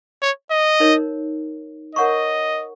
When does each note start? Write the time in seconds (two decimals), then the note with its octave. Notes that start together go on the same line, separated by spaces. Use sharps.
0.22 C#5
0.51 D#5
0.80 D#4 A#4 C#5
1.95 A#4 C#5 D#5 F#5 A#5 C#6